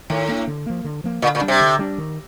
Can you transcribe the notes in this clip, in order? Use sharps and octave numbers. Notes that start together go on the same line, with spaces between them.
A2 D#3
A#3 D4
D3
F3 A#3
D3
F3 A#3
A#2 D3
A#2
G3 D4
C3
D3
G3 D4
D#3